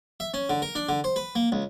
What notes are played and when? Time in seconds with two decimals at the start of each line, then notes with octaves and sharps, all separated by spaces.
0.20 E5
0.34 C#4
0.50 D3
0.62 A#4
0.75 D4
0.89 D3
1.04 C5
1.16 B4
1.35 A#3
1.52 C#2